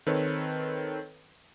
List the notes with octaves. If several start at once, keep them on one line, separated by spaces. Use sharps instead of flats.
D#3 C4 A4 B4 C#5